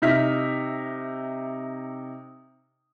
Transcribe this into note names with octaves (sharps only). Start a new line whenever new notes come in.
C3 D#4 E5 F6 B6